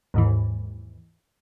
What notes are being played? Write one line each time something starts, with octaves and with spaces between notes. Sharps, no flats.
D#2 G#2 E3